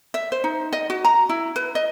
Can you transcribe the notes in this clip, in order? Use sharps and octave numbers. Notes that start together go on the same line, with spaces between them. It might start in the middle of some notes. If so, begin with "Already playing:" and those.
E5
C5
D#4
D#5
F#4
A#5
E4
B4
D#5